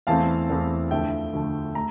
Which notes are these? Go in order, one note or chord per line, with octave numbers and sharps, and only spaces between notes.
E2 E3 A3 C4 F5 A5
E2 E3 A3 C4
D2 D3 F3 A3 E5 G5
D2 D3 F3 A3
A3 A#5